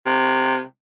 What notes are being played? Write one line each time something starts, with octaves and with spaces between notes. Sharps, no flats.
C3